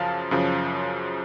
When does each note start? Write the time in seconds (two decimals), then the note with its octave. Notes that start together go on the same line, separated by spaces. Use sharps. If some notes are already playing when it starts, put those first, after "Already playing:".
Already playing: F#2 C#3 F3 F5 A5
0.31 F#2 C#3 F3